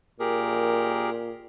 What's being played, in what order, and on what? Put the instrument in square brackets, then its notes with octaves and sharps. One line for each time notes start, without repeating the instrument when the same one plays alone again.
[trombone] A#2 [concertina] G4 G#4 A#4